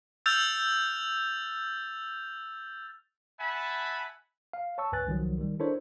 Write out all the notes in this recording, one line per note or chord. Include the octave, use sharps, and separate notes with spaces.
E6 F6 G6 A6 F7
E5 F#5 G#5 A5 B5
F5
C#5 A5 C#6 E6
C#2 G2 B4 G#5 F#6 A6
C2 D#3 F3 F#3
D#3 G3
D4 E4 A4 A#4 C5 C#5